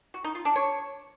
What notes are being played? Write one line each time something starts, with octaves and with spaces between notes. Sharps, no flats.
F#4
D#4
F4
D4
C#5